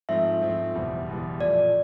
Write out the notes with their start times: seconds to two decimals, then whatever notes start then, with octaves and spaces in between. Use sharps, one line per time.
0.09 G#2 F3 A3 C4 E5
0.42 G#2 F3 A3 C4
0.75 F#1 E2 B2 G3
1.08 F#1 E2 B2 G3
1.41 A#2 F3 A3 D5